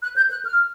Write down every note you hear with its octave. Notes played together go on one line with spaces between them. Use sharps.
F#6
G6
F#6
F6